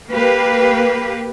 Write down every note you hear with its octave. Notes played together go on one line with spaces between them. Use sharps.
A#3 G4 B4